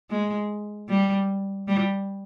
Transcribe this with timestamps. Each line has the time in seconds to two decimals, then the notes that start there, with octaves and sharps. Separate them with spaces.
0.10 G#3
0.89 G3
1.68 G3